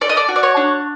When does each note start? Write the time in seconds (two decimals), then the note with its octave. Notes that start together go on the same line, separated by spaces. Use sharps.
0.01 A4 D5
0.09 D#5
0.17 D5
0.29 F#4
0.36 D5
0.43 C#5
0.57 D4